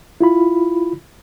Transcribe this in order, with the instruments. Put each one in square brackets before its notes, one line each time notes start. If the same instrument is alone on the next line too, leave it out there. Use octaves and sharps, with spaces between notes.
[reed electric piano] E4 F4 B5